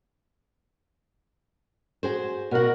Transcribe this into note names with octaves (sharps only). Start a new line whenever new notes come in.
F#4 G#4 C5
B2 F#4 A#4 F#5